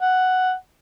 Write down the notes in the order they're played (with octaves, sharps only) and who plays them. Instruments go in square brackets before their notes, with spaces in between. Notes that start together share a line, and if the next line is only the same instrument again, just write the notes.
[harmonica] F#5